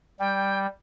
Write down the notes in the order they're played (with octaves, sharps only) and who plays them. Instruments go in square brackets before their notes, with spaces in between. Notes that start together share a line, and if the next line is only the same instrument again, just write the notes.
[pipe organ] G3 [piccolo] G5